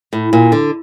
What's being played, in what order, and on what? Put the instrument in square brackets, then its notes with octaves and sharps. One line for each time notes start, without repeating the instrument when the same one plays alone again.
[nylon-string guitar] A2
A#2
D3